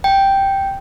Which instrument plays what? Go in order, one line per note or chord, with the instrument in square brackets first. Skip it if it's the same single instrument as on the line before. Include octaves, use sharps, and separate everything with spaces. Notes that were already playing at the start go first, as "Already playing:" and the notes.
[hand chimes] G5